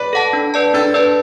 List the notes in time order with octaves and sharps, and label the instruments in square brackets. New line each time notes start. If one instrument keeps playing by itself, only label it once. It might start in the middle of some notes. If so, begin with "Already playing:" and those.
Already playing: [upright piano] B4 D5
[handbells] A4 F#5 A5
D4
B4 D5 A5
[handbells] D4 [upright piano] A4
[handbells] B4 D5 A5